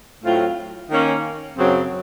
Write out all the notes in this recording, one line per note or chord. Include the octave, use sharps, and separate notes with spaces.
A2 F#3 C4 F4
D#3 A#3 C#4
F#2 C#3 F#3 C4